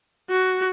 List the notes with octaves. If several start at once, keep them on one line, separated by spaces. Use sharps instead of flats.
F#4